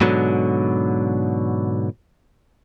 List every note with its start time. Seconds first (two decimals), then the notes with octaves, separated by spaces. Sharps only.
0.01 G#2 B2 D3 F#3